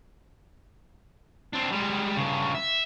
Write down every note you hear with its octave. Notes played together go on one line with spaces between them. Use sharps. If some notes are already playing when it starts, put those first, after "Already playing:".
C4 D4
G3 G#3
G2 C#3
E5